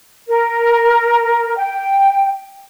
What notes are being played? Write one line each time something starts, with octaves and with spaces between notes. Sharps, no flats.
A#4
G5